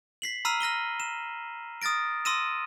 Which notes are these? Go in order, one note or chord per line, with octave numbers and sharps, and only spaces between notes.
B6 C7 F#7
A#5 B5 E6 F6 C7 D#7
F6 A#6 D#7 G7
E7
D#6 F6 A6 A#6 D7
C6 D#6 E6 A#6 D#7 E7